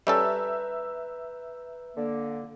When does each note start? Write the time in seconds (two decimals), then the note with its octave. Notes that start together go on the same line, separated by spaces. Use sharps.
0.07 G3 C#4 A4 B4 E5 A#5 E6 G6
1.96 D3 A#3